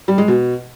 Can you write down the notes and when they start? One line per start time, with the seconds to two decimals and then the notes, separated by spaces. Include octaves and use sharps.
0.08 G3
0.18 G#3
0.28 B2